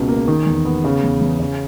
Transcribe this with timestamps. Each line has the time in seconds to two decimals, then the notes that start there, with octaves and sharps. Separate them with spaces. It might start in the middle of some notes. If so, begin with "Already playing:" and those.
Already playing: C#2 B2
0.08 A#3
0.28 D#3
0.46 E2
0.65 B3
0.84 C#3
1.03 E2
1.21 E2
1.40 C#3